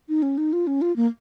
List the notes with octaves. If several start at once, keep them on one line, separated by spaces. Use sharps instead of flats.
D#4
C#4
D#4
F4
C#4
F4
A#3